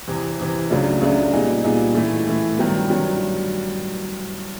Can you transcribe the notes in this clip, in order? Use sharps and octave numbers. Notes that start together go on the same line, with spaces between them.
E2 C3 E3
E2 C3 E3
C#2 C#3 F#3 A3 D4
C#2 C#3 F#3 A3 D4
A#2 G3 B3 D#4 G#4
A#2 G3 B3 D#4 G#4
A2 E3 A3
A2 E3 A3
G2 D#3 F#3 B3
G2 D#3 F#3 B3